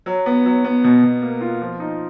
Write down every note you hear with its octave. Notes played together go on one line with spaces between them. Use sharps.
F#3
B3
F#3
B3
B2
B2
A#3
F4
F3
D#4